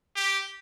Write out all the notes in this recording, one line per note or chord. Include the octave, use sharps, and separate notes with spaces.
G4